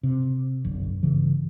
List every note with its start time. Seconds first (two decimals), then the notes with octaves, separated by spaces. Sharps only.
0.03 C3
0.65 F#1 B1 D3
1.03 G1 C#3 E3